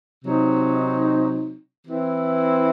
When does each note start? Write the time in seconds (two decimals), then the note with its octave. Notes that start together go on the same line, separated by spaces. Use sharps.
0.24 C3 F#3 C4 D#4
1.87 E3 C4 E4